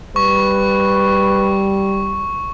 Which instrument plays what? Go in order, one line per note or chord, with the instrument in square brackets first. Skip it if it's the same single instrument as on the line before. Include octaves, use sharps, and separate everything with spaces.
[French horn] G3 [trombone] B4 [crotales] C#6